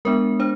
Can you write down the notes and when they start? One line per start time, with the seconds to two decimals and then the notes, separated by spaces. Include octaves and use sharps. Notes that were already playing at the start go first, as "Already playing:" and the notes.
0.05 G#3 B3 D4 A#4
0.40 D4 C5